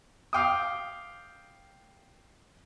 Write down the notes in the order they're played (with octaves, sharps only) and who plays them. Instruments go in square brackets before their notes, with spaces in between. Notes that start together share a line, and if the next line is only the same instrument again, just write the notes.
[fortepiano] F5 G5 D6 D#6